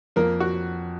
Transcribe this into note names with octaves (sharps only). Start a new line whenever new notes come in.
F2 A#3 A#4
F#4